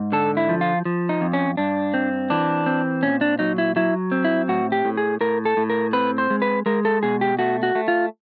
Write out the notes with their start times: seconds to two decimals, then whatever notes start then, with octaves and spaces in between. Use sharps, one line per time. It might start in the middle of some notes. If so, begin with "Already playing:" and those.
Already playing: G#2
0.12 D3 A4
0.37 E4
0.49 F3
0.61 F4
0.85 F3
1.09 D#4
1.21 F2
1.33 C#4
1.57 G2 D4
1.94 C4
2.30 E3 D4
2.66 C4
3.03 A#2 C#4
3.21 D4
3.39 F#3 D#4
3.58 E4
3.76 F#3 E4
4.12 C4
4.25 E4
4.48 A2 F#4
4.72 G4
4.85 A2
4.97 G#4
5.21 A2 A#4
5.45 A4
5.57 A2
5.70 A#4
5.93 C4 B4
6.18 C5
6.30 G#3
6.42 B4
6.66 G#3 A#4
6.85 A4
7.03 B2 G#4
7.21 G4
7.39 A3 F#4
7.63 F#4
7.75 A3
7.88 F4